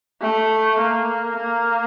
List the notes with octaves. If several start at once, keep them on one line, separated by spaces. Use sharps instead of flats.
A3
A#3
A#3